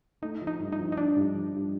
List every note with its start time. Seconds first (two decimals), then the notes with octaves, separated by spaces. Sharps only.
0.22 A3 D#4
0.41 F3
0.47 D#4
0.60 G2
0.72 D#4
0.79 F3
0.92 D#4
0.97 F3 D4
1.16 G2
1.35 F3
1.53 G2